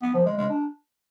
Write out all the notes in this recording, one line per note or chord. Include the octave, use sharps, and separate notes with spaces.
B3
F3
G#3
G#3
D4